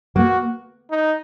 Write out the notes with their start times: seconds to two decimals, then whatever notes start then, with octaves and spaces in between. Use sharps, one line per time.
0.16 A#3 F#4
0.90 D#4